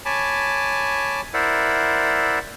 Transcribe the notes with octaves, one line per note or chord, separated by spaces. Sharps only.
C#5 G#5 A5 B5 D6
E4 A#4 C5 D5 E5 F#5